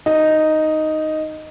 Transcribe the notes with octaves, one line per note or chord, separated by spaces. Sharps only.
D#4